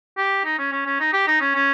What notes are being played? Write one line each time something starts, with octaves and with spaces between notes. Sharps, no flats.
G4
D#4
C#4
C#4
C#4
D#4
G4
D#4
C#4
C#4